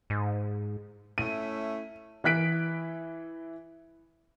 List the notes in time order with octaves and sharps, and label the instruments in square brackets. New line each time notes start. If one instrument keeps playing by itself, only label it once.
[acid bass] G#2
[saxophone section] A3 C#4 E4 [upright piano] D#7
[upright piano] E3 E4 F#6 B6 D7